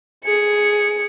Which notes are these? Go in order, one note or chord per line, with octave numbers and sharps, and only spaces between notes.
G#4 C#7